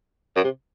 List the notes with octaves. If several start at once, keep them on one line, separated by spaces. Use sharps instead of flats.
F#2
C3